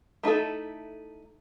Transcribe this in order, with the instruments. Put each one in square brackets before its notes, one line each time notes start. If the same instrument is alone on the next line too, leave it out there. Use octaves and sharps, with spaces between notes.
[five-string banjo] A3 D#4 E4 A4